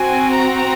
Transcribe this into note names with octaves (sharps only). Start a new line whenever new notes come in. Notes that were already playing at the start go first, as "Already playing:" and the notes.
Already playing: C4 F#4 G#5
A#5